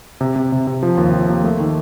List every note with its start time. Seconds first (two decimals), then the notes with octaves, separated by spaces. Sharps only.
0.21 C3
0.36 C3
0.52 C3
0.67 C3
0.83 F3
0.97 D#2
1.13 F3
1.29 A#3
1.44 A3
1.60 D#3